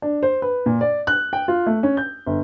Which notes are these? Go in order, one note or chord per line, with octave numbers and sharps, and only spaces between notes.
D4
C5
B4
A#2
D5
F#6
G5
F4
A3
C#4
G6
G1